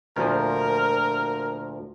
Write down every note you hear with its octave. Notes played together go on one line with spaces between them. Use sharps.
D2 A#2 F3 A#4